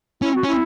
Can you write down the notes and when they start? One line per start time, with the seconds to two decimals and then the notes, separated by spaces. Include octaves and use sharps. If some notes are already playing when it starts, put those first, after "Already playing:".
0.21 C#4 E4
0.35 F#4
0.43 C#4
0.47 E4